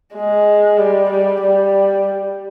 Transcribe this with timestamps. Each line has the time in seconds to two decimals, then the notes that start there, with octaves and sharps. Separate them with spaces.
0.14 G#3
0.78 G3
1.10 G3
1.42 G3